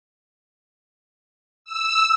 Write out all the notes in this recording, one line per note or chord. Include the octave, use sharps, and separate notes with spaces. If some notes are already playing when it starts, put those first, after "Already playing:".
E6